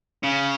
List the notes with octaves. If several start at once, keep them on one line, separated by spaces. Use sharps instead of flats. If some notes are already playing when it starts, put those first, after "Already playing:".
C#3